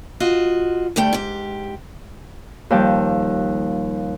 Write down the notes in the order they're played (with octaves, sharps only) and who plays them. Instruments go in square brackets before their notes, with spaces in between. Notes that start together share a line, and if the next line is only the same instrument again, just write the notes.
[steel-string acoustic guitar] F4 F#4 D#5
D2 G3 A3 G5
G#2 G4
[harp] D#2 F3 G3 G5 A5